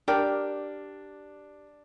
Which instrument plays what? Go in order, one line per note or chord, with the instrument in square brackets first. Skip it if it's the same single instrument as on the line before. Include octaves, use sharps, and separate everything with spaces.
[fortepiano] D4 [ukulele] G4 A#4